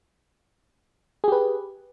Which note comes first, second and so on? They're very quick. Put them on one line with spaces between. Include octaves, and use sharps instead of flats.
G#4 G4 B4